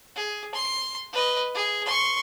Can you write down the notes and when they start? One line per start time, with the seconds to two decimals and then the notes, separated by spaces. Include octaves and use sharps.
0.16 G#4
0.54 C6
1.13 B4 D#5
1.55 G#4
1.86 C6 C#6